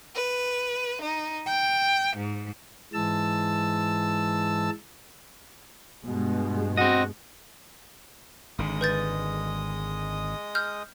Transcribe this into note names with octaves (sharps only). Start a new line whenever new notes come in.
B4
D#4
G5
G#2
G#2 E3 G#3 A5 E6
G2 B2 G#3
C4 F#4 D#5
G#1 D3 G#3 D#5 D#6
B4 G6 A6
F6 G6